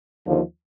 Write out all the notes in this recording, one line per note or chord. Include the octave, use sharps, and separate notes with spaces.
D#2 D3 F3